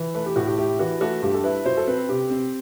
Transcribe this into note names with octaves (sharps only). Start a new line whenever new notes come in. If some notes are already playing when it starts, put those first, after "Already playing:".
Already playing: E3
A3 B4
G4
A2 F#4
G4
E4 G4
E3 F#4
A3 F#4
G2 G4
A4
E4 B4
F#3 C5
A4
C4 B4
C3 G4
C4